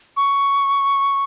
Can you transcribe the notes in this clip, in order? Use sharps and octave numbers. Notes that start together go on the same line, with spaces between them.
C#6